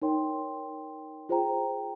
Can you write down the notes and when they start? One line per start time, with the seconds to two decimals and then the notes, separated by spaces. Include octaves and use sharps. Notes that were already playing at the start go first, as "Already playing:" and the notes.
0.02 D#4 A#4 C#5 G5 C6
1.29 F4 G#4 C5 G5 A#5